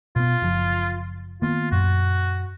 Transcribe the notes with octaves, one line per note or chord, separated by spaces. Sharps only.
B2 B3 F4
F#1 F3
D#3 A#3 B3 F4
F#2 A#2 F#4